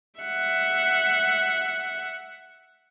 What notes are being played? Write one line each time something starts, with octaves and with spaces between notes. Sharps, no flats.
E5 F#5